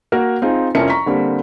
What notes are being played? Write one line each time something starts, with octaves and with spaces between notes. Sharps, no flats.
A#3 F#4 A#4 F#5
C4 D#4 F4 G#4
C2 F2 F3 C#4 A#4 C#7
A#5 C#6 B6
D3 G3 A#3 C4